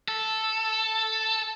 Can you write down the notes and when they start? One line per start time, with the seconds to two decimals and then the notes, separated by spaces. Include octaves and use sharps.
0.08 A4